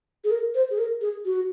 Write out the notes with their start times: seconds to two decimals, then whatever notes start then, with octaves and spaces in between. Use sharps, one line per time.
0.24 G#4
0.30 A#4
0.55 C5
0.70 G#4
0.78 A#4
1.01 G#4
1.25 F#4